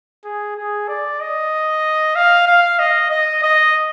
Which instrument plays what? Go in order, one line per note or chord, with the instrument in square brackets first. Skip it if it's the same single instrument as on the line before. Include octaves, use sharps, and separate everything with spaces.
[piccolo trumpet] G#4
G#4
D5
D#5
F5
F5
D#5
D#5
D#5